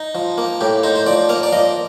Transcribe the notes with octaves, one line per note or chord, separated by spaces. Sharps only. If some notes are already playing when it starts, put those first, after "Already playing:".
Already playing: D#4
F3
A#3
A2 G4
D#4 C5
C5
F3 D5
A#3 F5
D5
F3 D#5